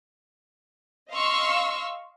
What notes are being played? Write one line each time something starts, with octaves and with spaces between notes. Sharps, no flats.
D#5 F5 C6 C#6 E6 F6